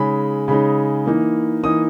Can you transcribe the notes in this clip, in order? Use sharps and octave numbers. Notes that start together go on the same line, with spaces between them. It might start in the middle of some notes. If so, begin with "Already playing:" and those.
Already playing: C#3 G#3 D#4 B5
C#3 G#3 D#4 B5
E3 A#3 D#4
E3 A#3 D#4 D#6